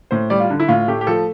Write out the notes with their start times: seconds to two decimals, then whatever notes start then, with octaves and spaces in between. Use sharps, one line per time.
0.11 A2 C5
0.30 G3 D5
0.40 F4
0.50 D3
0.60 E4
0.68 A2 F4
0.88 A3 G4
1.01 G4
1.07 F3 A4